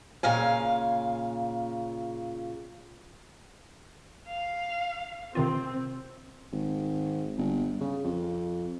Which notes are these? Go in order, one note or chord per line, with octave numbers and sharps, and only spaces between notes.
A#2 C#3 F5 G#5
F5
C3 D#3 C4 F4
G#1
G1
C#3
F2